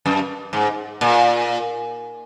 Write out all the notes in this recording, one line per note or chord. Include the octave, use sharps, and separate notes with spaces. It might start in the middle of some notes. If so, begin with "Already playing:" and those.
F#2
G#2
A#2